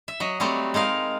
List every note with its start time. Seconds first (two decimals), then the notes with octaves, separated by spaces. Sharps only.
0.08 E5
0.20 F#3 D#5
0.40 F#3 G3 A3 C4
0.74 G#3 D#4 A#4 F5